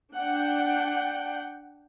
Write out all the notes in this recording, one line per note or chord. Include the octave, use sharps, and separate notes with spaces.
D4 F#5 G5